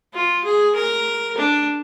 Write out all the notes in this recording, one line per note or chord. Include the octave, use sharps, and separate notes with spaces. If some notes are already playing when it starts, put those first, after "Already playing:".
F4
G#4
A#4
D4